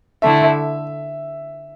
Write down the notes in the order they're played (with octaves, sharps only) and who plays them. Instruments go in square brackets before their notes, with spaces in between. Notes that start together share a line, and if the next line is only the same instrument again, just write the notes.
[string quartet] D3 A3 E4 [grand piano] E5